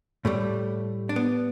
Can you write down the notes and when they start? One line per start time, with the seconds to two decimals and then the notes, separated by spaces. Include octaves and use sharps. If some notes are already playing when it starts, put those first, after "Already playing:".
0.25 A2 G3 A3
1.09 D4
1.16 B3